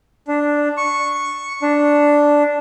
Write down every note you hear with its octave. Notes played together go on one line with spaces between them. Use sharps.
D4
C#6
D4